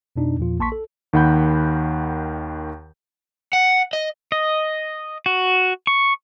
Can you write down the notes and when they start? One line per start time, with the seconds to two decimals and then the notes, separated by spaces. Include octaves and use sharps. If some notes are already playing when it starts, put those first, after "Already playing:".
0.16 F2 B2 D4 D#4
0.39 E2 A#2 F3 F4
0.59 A#1 A#3 A5 C6 C#6 B6
0.72 A4
1.13 D#2 D#3 F#5 B5 G6
3.53 F#5
3.93 D#5
4.32 D#5
5.26 F#4
5.87 C#6